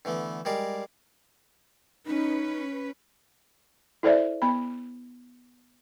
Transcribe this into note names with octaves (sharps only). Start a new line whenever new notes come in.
D3 E3 A3 B3
G3 G#3 A#4 D5 F5
C#4 D#4 B4
E4 A4 C5 D5 E5
B3 B5